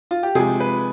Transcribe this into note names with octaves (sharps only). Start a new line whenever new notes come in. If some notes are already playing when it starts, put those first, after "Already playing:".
F4
G4
C3 F3 G#3 G#4
B4